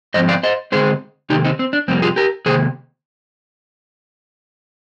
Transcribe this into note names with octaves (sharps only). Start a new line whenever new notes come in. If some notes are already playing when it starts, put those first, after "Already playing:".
G#2 F3 C4 C5 D#5
D5 F5
C5 D#5
D3 G#3 C4 G#4 C5
C3 D#3 A#3 D#4 G4
C4 D#4
C4
D4
F2 C3 G3 A#3 C4
F4 G#4
G4 A#4
C3 D#3 A#3 G#4 C5